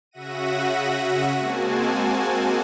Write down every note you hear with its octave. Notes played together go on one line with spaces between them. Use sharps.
C#3 F#4 E5 F#5 A#6 D#7
G#3 A#3 C4 F#4 G#5 A5